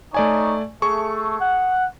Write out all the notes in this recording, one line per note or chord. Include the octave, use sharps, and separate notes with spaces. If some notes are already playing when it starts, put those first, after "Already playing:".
A3 D#4 C#5 D5 G#5 C#6
A3 G#4 C#6
F#5